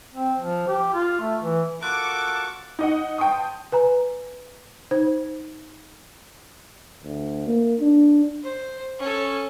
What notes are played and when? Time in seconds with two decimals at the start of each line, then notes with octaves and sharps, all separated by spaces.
0.15 C4
0.40 F3
0.68 G4
0.94 F4
1.20 A3
1.41 E3
1.83 F4 F#4 A4 A#4 C#6 D6 F#6
2.79 D#4 D#5 F#5
3.18 G5 A5 C6 D#6
3.72 B4 G#5 A#5
4.91 D#4 C5
7.04 D2
7.47 A#3
7.80 D4
8.43 C5
8.99 C#4 A4